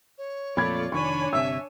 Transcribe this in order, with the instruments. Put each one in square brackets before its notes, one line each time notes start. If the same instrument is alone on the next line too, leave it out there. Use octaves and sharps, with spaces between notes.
[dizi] C#5
[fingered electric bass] F2 A#2 [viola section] A3 F4 D5 [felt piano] B5 G#6
[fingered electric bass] F1 D#3 [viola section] D4 C#5 G#5 [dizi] B5 [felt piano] C#6
[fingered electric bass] G1 C3 [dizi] E5 [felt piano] E6